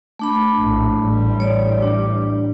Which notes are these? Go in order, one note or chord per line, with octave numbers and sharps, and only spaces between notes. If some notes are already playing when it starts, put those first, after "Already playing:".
A3 D4 B5
A#1 A2
A1 G3
C#5 D5
D4